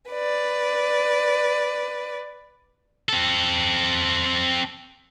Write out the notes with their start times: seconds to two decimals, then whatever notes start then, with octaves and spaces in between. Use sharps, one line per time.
0.10 B4 D5
3.09 C4 A4